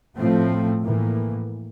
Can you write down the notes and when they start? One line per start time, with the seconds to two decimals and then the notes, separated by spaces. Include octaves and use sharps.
0.17 A2 F3 A3 C4
0.80 A2 E3 A#3